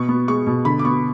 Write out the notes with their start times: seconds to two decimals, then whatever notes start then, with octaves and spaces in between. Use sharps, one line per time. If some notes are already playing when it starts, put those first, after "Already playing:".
Already playing: B2 C#6
0.09 B3
0.28 G#3 C#6
0.47 B2
0.65 D3 B5
0.79 D6
0.85 B3 C#6